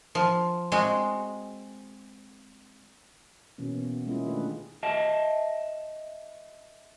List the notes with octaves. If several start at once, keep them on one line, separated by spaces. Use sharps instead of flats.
F3
G#3 C4 F#4 G#4
B2 E3 A#3 C#4
B3
G#3 A#3 C#4 E4 F4 G#4
D#3 A3 D4 G4 B4
D#5 E5 A5